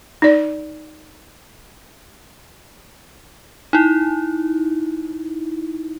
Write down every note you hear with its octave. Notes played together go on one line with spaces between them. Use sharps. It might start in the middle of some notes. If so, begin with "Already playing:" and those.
D#4 D5
D#4 E4